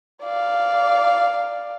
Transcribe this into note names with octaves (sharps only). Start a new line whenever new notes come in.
D5 F5